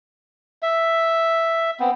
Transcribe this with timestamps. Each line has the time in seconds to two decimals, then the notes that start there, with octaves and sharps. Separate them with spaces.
0.62 E5
1.80 B3 C4